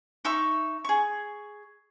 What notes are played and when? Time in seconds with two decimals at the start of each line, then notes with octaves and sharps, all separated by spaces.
0.25 D#4 E5 C#6
0.85 G#4 C#6